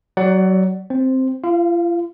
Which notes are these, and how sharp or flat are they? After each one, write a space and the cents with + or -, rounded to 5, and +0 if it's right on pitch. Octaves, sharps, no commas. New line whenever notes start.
F#3 +25 D5 +0 F#5 +15
C4 +0 C5 +0
F4 -40 F5 +0